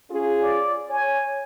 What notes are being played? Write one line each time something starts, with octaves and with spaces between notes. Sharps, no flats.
C#4 F4 G#4
D5
C#5 G#5